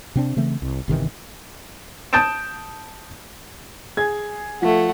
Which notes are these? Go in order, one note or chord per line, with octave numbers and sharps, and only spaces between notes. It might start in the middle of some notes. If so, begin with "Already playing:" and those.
C3 C4 D4
C#3 E3 A3 C4
C2
G1 C3 D#3 E3
A5 D#6 G6 A6 D7 E7
G#4 G#6
F3 A3 F#5